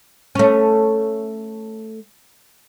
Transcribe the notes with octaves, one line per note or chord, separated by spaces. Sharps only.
A3 C#4